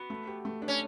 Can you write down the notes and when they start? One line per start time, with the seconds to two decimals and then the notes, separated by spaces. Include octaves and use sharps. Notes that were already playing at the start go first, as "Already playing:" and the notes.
Already playing: B3 F#4
0.10 A3
0.27 G4
0.45 A3
0.62 D4
0.68 C#4